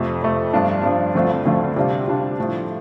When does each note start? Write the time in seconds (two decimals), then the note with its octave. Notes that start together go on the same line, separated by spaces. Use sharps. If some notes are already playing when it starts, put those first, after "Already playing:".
Already playing: F2 C3 A3
0.22 F2 C3 A3
0.53 G2 F3 D4 F4
0.83 G2 F3 D4 F4
1.15 D2 D3 A3 C4 F4
1.45 D2 D3 A3 C4 F4
1.76 C3 G3 D4 F4
2.07 C3 G3 D4 F4
2.38 A2 F3 A3 F4